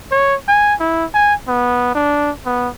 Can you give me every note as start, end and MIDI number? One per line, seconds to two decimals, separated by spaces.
0.11 0.35 73
0.48 0.75 80
0.80 1.05 64
1.14 1.34 80
1.48 1.91 59
1.95 2.31 62
2.45 2.68 59